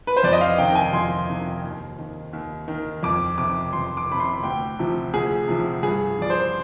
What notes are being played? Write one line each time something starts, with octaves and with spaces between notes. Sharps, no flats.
B4
C5
F2 D5
D#5
F5
C3 D#3 G5
G#5
F2 C6
C3 D#3
D#2
D#3
D#2
D#3
F2 D6
C3 D#3 D6
F2 C6
D6
C3 D#3 B5
C6
D2 G5
C3 F3
D2 G#4
C3 F3
G2 G#4
F3 D5
C5